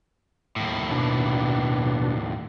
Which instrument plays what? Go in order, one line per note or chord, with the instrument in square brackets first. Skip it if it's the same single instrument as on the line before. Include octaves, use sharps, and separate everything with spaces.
[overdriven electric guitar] D#2 A2
[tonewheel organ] B2 D4